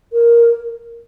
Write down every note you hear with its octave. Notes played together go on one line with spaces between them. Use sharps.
A#4